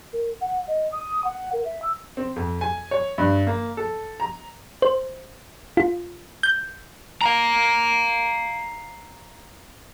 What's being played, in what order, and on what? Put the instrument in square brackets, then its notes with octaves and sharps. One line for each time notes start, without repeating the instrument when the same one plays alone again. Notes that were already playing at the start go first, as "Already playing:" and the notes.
[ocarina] A#4
F#5
D#5
D#6
F#5
A#4
E5
E6
[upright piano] C4
F2
G#5
C#5
G2
A#3
A4
A#5
[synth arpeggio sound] C5
F4
G6
[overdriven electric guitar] F5 A#5